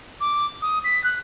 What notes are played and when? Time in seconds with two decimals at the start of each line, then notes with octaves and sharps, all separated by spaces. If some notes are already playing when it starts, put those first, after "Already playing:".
0.20 D6
0.62 D#6
0.84 B6
1.04 F#6